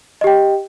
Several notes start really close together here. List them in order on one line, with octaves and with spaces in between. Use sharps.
D#5 G4 G5